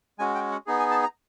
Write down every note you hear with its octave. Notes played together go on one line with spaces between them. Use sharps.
G#3 C#4 F#4 G#5
G5
F#5
B3 D#4 G#4
G#5
A5
A#5